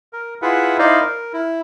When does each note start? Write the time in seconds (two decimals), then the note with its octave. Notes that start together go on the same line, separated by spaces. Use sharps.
0.13 A#4
0.42 E4 F4 G#4 B4 E5 F#5
0.79 D#4 E4 C5 D5 D#5 F5
1.00 A#4
1.33 E4